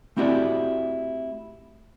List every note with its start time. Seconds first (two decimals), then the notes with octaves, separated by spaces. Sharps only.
0.17 A3 C4 E4 F#4 G4 D5